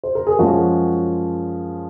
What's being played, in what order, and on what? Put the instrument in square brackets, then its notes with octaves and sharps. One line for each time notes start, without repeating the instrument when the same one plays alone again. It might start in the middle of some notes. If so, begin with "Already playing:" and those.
[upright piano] C5
A#4
G#4
F#2 F3 G#3 C#4 F#4